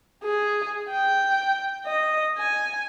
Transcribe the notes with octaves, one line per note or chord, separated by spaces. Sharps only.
G#4
G5
D#5
G#5